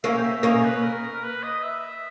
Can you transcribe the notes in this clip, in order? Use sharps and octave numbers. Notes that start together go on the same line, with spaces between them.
A#3 C#4 E5
G5
E5
A#3 C#4 D#5
B4
A#4
A#4
B4
D#5
E5